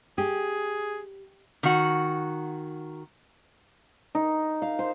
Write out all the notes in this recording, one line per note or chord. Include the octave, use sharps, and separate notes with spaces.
G4 G#4
D#3 F#4
D#4
F5
C5